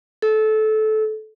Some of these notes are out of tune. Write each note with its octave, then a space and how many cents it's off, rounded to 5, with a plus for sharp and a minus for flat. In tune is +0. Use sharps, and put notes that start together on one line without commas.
A4 -20